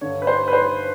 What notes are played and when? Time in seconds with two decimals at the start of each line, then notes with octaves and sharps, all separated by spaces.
0.01 G2 D3 C#5
0.22 B4
0.27 C5
0.48 B4
0.53 C5